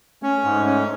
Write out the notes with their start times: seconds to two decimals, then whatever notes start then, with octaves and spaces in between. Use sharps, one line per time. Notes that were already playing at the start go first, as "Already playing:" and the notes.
0.22 A3 C#4
0.38 A3
0.44 G#2
0.52 A3
0.66 A3 C#4